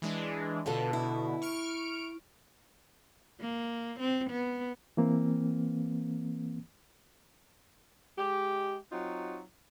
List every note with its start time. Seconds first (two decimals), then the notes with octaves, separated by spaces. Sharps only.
0.02 E3 G#3 D4
0.66 B2 D3 B3 F4 A4
0.93 E4
1.42 C#6 F6 D7
3.41 A#3
4.00 C4
4.30 B3
4.97 E3 A#3 C4
8.18 G#3 G4
8.92 F#3 C4 D#4 F4 F#4